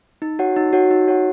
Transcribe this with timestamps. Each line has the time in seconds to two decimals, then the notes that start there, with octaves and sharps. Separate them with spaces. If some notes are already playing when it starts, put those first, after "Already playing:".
0.22 D#4
0.39 F#4 C#5 F#5
0.56 D#4
0.73 F#4 C#5 F#5
0.91 D#4
1.08 F#4 C#5 F#5